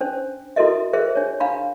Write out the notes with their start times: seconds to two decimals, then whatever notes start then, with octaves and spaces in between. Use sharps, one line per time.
0.01 C#4 D4 C5
0.56 E4 F#4 A4 A#4 D#5 E5
0.93 G#4 A#4 C5 E5
1.15 D4 C#5
1.40 D4 F5 A#5 B5